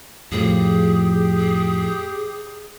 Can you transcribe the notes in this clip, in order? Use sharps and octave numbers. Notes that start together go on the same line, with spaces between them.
F2 A2 F3 G4 G#4